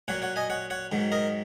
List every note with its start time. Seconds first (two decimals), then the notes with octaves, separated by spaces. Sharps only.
0.08 A#2 F#3 C#5 F#5
0.22 C#5 F#5
0.36 D#5 G#5
0.50 C#5 F#5
0.70 C#5 F#5
0.92 G#2 D#3 F#3
1.12 A#4 D#5